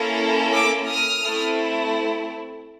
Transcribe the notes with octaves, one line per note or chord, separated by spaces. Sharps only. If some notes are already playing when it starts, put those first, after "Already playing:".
Already playing: A#3 C#4 E4 A4
D6 E6
D#6 F6
A3 C4 E4